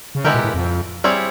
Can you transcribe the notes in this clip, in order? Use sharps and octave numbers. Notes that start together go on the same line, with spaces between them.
C#3
D3 G#3 B3 E4 G4 A#4
A#2
A2
F2
G3 C4 E4 G#4 C#5